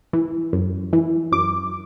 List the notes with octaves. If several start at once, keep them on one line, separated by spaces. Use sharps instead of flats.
E3
F#2
E3
F#2 D6